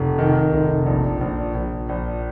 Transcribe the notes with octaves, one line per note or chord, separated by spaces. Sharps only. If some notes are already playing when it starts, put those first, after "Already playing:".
Already playing: F1
D#3
F1
A#1
A#1
A#1
A#1